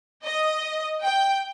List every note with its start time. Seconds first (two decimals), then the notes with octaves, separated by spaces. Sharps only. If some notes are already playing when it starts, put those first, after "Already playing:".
0.24 D#5
1.03 G5